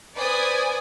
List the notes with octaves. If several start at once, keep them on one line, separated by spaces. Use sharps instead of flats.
B4 C5 D5 G#5 D#6